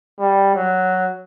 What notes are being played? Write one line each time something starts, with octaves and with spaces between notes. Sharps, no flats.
G3
F#3